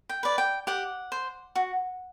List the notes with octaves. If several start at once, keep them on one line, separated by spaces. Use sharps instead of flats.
G5
B4 D5
G5
G4 F#5
C5
F#4